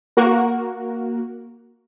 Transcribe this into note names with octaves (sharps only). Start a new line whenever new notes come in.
A#3 F#4 A#4